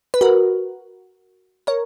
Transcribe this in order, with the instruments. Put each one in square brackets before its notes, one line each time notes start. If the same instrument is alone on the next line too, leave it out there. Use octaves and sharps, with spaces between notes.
[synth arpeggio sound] B4
F#4 A#4
A#4 C#5